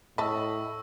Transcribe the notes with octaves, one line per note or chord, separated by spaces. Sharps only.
A2 D#5 E5 A5 B5 C#6 E6